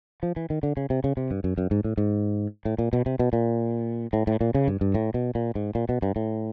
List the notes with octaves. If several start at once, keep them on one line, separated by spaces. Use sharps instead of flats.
F3
E3
D#3
D3
C#3
C3
C#3
C3
G2
F#2
F#2
G#2
A2
G#2
A2
A#2
B2
C3
B2
A#2
A2
A2
A#2
C#3
G2
G2
A2
B2
A#2
G#2
A#2
B2
G2
A2